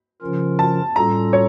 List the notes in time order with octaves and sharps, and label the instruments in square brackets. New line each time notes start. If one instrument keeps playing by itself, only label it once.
[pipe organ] C#3 F3 C#4 F4 A#4
[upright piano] A5
[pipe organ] A2 G3 C#4 F4 A4 [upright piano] A#5
[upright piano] C#5